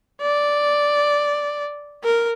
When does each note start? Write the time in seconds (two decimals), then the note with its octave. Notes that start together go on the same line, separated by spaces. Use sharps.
0.22 D5
2.04 A#4